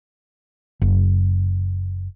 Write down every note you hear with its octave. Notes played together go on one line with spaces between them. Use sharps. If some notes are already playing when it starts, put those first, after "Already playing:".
F#1